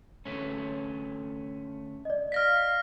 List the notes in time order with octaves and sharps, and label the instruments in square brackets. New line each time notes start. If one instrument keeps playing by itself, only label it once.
[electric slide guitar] D3 A3 C#4
[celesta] D5 D#5
[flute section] F5 [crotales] F6 A#6 B6